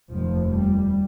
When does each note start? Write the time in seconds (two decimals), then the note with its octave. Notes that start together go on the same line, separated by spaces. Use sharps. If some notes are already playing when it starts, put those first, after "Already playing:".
0.10 F1 D#2 F3
0.51 G3